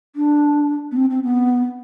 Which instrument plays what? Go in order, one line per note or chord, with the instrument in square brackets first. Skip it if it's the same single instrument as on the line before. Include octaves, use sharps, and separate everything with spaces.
[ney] D4
B3
C4
C4
B3